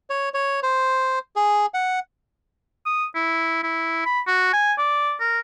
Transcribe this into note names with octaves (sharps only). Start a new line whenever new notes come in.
C#5
C#5
C5
G#4
F#5
D#6
E4
E4
B5
F#4
G#5
D5
A#4